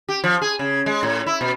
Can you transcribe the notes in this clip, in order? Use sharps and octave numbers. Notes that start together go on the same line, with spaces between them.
G4
F3
G#4
C#3
G#3
A2
E4
B2